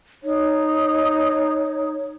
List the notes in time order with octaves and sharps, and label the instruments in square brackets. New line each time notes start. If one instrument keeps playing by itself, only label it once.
[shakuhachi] D#4 [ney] C#5